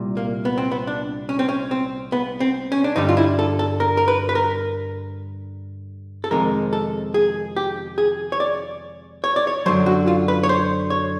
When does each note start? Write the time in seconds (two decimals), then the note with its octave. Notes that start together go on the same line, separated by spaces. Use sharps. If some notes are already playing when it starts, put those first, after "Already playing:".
Already playing: C2 A#2 G3
0.17 A#3
0.45 B3
0.58 C4
0.72 B3
0.87 D4
1.29 C#4
1.39 C4
1.49 C#4
1.71 C4
2.12 B3
2.40 C4
2.72 C#4
2.84 D4
2.96 G2 D3 G3 D#4
3.09 F4
3.17 E4
3.39 A4
3.59 A4
3.80 A#4
3.97 A#4
4.08 B4
4.29 B4
4.35 A#4
6.24 A4
6.31 F2 C3 D#3 G#3 A#4
6.73 A4
7.14 G#4
7.56 G4
7.98 G#4
8.32 C#5
8.40 D5
9.24 C#5
9.36 D5
9.47 C#5
9.66 F#2 D3 F#3 C5
9.86 F#4
10.08 F4
10.28 B4
10.43 C#5
10.49 C5
10.90 C#5